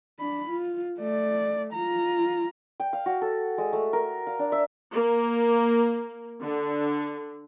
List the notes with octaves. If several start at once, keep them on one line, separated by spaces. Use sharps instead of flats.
D4 B5
F4
A3 D5
F4 A#5
G5
F5
F#4
A4
G#3
A3
A#4
F5
D4
E5
A#3
D3